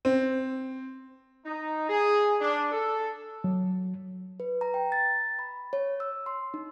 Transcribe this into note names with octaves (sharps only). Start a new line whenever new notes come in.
C4
D#4
G#4
D4
A4
F#3
B4
A#5
G5
A6
B5
C#5
E6
C6
D#4